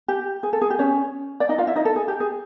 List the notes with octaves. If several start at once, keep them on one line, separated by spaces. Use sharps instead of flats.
G4
G#4
A4
G#4
G4
C#4 C#5
D5
D#4 D#5
F4 F5
E4 E5
D#4 D#5
A4
G#4
G4
G#4